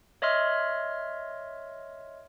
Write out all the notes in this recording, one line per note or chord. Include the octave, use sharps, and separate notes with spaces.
C#5 D#5 E5 C6 F6